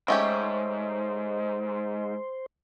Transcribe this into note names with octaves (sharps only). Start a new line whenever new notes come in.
G#2 A3 C#4 G4 C5 D#5